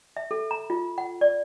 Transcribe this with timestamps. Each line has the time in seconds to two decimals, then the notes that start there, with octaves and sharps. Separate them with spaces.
0.17 E5
0.31 A4
0.51 A#5
0.70 F4
0.98 F#5
1.21 D5